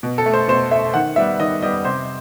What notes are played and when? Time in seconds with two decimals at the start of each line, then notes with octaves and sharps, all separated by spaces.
0.03 B2
0.18 A4
0.26 A3
0.34 C5
0.48 B2 C5
0.71 A3 E5
0.94 D#3 F#5
1.16 G3 B3 E5
1.40 D#3 D#5
1.62 G3 B3 D#5
1.85 C3 C5